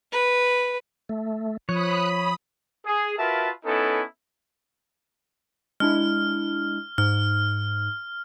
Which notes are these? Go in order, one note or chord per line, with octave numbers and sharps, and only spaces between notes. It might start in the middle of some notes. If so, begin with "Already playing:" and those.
B4
A3
F3 C#5 B5 D#6 F#6
G#4
F4 F#4 A#4 B4 E5 A5
B3 C#4 D#4 E4 A4
G#3 D4 E4 F6
G#2 F6